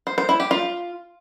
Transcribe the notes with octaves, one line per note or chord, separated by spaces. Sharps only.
C5
C5
E4
G4
F4